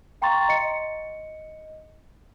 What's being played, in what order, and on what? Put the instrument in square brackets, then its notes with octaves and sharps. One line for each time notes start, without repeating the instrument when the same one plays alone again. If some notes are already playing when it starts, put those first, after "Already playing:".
[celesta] F5 G5 A#5 C6 C#6 A6
D#5 C#7